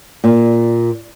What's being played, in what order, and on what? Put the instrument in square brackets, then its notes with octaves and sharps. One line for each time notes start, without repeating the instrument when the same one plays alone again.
[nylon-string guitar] A#2